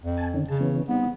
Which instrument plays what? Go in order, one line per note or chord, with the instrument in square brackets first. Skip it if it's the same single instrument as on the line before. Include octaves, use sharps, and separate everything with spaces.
[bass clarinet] F2
[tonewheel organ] G#5 A5
D3 D#3 C#4
[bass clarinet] C#3 [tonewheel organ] A5
[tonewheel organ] E3 B3 C#4
[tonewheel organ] G3 C4 D#4 [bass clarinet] B3